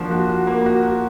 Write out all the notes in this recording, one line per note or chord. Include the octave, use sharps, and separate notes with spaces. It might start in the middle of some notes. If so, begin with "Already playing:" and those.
Already playing: F3 A#3 D4 F#4
F#4
F#4
A#3
F#4
F#4